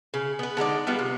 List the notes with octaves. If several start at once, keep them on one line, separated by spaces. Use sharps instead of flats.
C#3
B3 B4
D3 G#3 D#4 D5
G3 B3 F4
C3